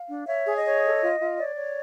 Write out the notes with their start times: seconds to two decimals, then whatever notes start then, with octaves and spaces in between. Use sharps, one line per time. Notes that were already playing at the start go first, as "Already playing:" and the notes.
Already playing: F5
0.09 D4
0.27 C#5 E5
0.46 G#4
0.56 D#5
0.64 C#5
0.84 A4
1.02 F4
1.20 F4
1.38 C#5 D5
1.57 C#5